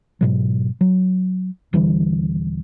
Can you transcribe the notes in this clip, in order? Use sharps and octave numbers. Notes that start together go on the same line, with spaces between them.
G#2 B2 F#3
F#3
D#1 D3 E3 G3